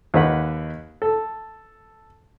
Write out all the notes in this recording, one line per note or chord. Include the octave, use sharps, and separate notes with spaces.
D#2 D#4 B4 F#5
A4